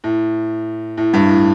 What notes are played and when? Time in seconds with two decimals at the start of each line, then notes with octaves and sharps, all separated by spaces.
0.04 A2
0.98 A2
1.14 G2
1.29 A2